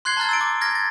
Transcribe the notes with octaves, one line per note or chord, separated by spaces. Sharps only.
C6 F#6 G#6 C7 G7
A5 A#5 F6 A6
E6 A6 D7
D6
F6 G#6 A#6
A6